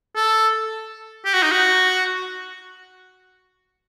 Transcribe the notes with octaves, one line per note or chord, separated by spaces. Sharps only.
A4
G4
F#4
D#4
F#4